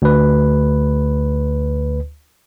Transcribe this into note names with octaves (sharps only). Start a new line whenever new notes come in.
D2 B4